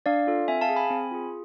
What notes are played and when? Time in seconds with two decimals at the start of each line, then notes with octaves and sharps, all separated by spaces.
0.06 D4 D5 F5
0.27 F4 A4
0.48 C4 E5 G#5
0.61 F5 A5
0.69 G#4
0.76 G#5 B5
0.90 C4
1.11 F4 G#4